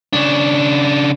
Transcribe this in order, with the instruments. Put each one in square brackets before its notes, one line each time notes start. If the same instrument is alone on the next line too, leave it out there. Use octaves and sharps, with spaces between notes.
[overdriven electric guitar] C#3 D4